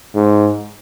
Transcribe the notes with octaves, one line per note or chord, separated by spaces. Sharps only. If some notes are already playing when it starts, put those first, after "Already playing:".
G#2